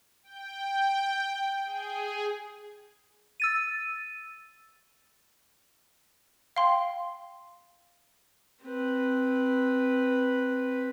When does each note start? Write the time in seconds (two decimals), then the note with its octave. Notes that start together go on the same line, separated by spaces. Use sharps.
0.23 G5
1.65 G#4
3.40 E6 A6 D#7
6.56 F5 G5 C6
8.64 C4 B4